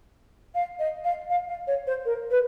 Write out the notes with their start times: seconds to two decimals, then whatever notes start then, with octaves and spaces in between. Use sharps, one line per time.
0.54 F5
0.79 D#5
1.04 F5
1.29 F5
1.48 F5
1.67 C#5
1.87 C5
2.05 A#4
2.30 B4